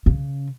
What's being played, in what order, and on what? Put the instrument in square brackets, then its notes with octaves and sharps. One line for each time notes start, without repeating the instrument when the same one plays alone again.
[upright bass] C#3